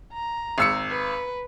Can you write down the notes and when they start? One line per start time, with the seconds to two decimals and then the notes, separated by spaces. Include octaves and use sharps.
0.13 A#5
0.58 G#1 E6 C#7
0.91 B4